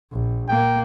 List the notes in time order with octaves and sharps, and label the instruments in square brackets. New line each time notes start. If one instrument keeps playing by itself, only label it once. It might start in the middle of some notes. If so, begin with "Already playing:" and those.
[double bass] A#1
[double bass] A#2 A#3 [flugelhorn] G5